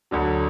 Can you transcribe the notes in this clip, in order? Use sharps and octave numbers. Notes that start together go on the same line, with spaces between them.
D2 D3 F#3